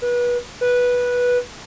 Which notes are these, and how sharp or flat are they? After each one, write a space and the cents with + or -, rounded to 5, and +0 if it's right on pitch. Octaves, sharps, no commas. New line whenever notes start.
B4 -30
B4 -10